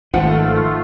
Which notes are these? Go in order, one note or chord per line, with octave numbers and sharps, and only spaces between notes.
G#1 D#3 F3 A3 F4 B4 F#5 G5